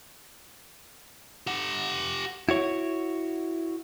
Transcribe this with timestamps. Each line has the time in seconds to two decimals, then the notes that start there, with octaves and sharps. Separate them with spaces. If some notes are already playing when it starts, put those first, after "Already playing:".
1.47 G4 F#5
2.49 E4 F#4 C#5